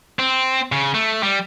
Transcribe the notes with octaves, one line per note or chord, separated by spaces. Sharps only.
C4
C#3
A3
G3